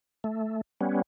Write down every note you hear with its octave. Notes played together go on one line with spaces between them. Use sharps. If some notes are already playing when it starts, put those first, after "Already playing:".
A3
G3 B3 C#4